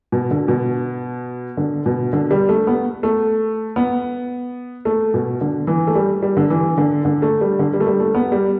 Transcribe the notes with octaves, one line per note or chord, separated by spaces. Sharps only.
B2
D3
B2
D3
B2
D3
G3
A3
B3
A3
B3
A3
B2
D3
E3
A3
G3
G3
D3
E3
D3
D3
A3
G3
D3
G3
A3
G3
A3
B3
G3